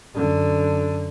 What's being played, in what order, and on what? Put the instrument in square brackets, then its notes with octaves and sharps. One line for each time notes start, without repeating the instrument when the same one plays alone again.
[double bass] F#2 D3